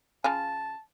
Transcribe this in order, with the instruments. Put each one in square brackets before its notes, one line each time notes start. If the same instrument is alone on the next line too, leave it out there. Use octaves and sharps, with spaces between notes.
[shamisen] C#3 F4 G#5 [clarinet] A5